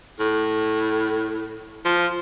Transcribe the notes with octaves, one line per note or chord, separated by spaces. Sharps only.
A2
F3